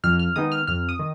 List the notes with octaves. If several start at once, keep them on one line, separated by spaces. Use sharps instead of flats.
F2 F6
F6
D#3 G#3 B3 D#4 D#6
F6
F2 F6
D#6
D#3